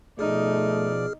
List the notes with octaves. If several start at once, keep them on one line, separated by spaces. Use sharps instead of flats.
B2 F3 A3 D#4 G#4 D5 F6